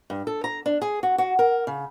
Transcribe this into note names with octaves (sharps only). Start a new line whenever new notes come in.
G2
A4
A#5
D4
G#4
F#4
F#4
A#4
C#3